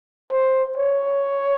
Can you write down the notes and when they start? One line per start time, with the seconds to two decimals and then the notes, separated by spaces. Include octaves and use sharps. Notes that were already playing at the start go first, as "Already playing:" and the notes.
0.31 C5
0.77 C#5